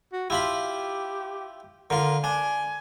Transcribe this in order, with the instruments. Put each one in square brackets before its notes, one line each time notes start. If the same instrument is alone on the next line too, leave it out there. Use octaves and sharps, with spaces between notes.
[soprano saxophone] F#4
[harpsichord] E4 F4 B5 [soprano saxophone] G4
[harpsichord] D3 F4 [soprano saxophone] A#4
[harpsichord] D4 [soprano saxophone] G#5